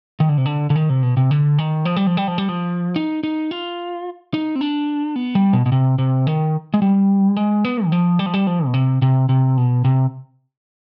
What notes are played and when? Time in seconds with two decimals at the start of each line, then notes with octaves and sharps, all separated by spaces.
0.20 D#3
0.29 D3
0.38 C3
0.46 D3
0.70 D3
0.76 D#3
0.90 C3
1.03 B2
1.17 C3
1.31 D3
1.59 D#3
1.85 F3
1.96 G3
2.07 F3
2.17 G3
2.28 F3
2.38 G3
2.49 F3
2.96 D#4
3.23 D#4
3.51 F4
4.34 D#4
4.55 C4
4.61 D4
5.16 B3
5.35 G3
5.53 B2
5.66 B2
5.72 C3
5.98 C3
6.27 D#3
6.74 G#3
6.82 G3
7.37 G#3
7.65 B3
7.86 D#3
7.92 F3
8.19 G3
8.26 F3
8.34 G3
8.47 F3
8.66 B2
8.74 C3
9.02 C3
9.29 C3
9.57 B2
9.85 C3